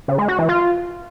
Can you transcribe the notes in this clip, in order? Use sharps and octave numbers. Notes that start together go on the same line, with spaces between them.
C#3
G#3
F#4
E3
F4